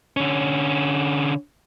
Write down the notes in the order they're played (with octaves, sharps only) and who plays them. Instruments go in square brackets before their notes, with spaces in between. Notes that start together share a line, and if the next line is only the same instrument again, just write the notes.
[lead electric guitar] D3 C#4